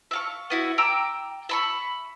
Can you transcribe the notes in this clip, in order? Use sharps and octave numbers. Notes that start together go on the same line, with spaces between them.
E5 F5 C#6
B3 E4 F#4
G5 A#5 D6 E6
E5 B5 C#6